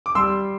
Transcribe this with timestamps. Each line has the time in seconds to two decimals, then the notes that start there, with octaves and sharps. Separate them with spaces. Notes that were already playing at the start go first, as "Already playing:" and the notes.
0.06 D6
0.15 G3 C6 E6